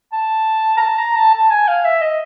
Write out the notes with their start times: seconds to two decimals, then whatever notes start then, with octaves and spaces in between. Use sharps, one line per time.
0.13 A5
0.77 A#5
0.81 A5
0.98 A#5
1.16 A5
1.34 A5
1.51 G#5
1.68 F5
1.85 E5
2.02 D#5